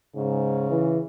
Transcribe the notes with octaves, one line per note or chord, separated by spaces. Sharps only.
G#2 C#3
E3